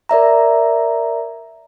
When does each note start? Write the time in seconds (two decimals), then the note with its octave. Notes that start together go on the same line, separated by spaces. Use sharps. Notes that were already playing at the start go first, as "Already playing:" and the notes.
0.09 A#4 D5 E5 A#5